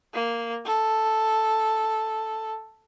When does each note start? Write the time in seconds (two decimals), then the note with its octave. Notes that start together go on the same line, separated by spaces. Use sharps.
0.14 A#3
0.65 A4